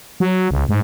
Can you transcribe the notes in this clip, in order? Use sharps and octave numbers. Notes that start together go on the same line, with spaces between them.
F#3
C#2
G#2